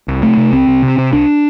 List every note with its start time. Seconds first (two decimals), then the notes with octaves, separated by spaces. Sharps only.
0.08 C2
0.22 C3 A3
0.38 C3
0.53 C2 C4
0.67 C2
0.83 C3
0.98 C3
1.13 C2 D4